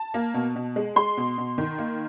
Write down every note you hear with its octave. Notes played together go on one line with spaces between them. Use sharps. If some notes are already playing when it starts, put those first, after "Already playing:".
Already playing: A5
A#3
B2
B2
G#3
G#3 C6
B2
B2
D#3
A#3